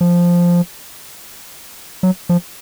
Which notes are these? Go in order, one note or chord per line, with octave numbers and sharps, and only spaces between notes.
F3
F#3
F3